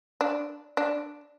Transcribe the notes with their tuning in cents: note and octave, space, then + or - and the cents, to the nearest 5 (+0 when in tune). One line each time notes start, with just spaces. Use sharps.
D4 +0
D4 +0